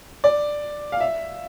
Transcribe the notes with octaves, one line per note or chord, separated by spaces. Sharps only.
D5
F5
E5